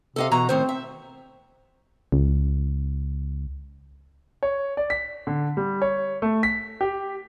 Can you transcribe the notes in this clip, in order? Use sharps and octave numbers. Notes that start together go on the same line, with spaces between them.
C3 A4 D#5 F5
B2 E3 F#4 A#5
A2 D#3 C4 C5
E5
C#2
C#5
D5
B6
D3
G3
C#5
A3
B6
G4